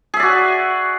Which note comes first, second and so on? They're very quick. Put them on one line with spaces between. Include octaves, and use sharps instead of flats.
G#4 E5 D5 F#4